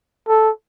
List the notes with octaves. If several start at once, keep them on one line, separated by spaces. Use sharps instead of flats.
A4